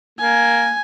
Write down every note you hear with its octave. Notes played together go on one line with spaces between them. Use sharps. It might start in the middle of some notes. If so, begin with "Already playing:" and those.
A#3 G#5